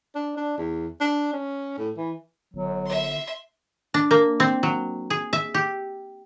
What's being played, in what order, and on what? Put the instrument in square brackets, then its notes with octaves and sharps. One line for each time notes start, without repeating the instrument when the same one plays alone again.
[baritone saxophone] D4
D4
E2
D4
C#4
A2
E3
[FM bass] G1 [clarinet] F#3
[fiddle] E5 C6
[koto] D4
A#3
C4
F#3
G#4
E5
G4